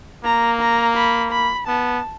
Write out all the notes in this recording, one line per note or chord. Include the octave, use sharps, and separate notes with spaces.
A#3 A#5
A#5
B5
B5
B3 A5